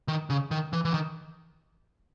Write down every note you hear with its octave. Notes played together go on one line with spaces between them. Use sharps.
D#3
C#3
D#3
E3
E3
D#3